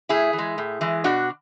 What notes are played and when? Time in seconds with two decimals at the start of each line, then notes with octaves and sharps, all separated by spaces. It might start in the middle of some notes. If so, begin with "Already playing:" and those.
0.09 A2 E4 G#4
0.33 E3
0.38 G#3
0.58 A2
0.81 E3 G#3
1.04 B2 D4 F#4